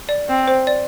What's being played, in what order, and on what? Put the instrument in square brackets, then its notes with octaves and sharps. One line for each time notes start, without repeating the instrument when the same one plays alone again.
[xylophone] D5
[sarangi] C4
[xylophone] C5
D5